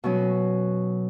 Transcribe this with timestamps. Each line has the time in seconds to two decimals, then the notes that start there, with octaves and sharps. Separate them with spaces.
0.04 B2 F#3 C#4